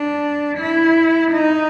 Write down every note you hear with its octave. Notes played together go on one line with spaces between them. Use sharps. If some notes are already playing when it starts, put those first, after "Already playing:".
Already playing: D4
E4
D#4